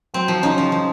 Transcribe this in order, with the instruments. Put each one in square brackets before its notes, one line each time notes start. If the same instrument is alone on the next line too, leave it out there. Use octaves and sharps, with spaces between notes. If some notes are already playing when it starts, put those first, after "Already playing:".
[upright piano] F#3 [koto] C4
[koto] F3
[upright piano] C#3 C#4 [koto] D#4
[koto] F3
F3